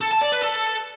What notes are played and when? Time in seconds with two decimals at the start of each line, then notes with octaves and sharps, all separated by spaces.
0.01 A4
0.11 A5
0.22 D5
0.32 B4
0.42 A4